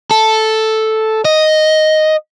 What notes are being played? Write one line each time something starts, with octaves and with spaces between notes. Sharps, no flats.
A4
D#5